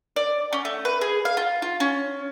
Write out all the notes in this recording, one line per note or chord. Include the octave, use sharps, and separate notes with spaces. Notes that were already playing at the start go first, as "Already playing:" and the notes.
D5
C#4
A3
B4
G#4
F5
F4
F4
C#4